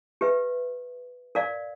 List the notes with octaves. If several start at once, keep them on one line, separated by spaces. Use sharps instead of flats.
G4 B4 E5
A#4 D5 F5